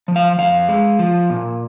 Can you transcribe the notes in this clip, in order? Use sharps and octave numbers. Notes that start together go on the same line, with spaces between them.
F3
F5
F2 F5
G#3
F3
A#2